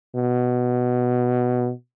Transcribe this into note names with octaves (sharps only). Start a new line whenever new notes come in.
B2